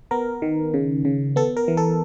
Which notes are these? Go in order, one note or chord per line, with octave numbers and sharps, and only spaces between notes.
B3 A#4
D#3
C#3
C#3
B3 A4
A#4
E3
A4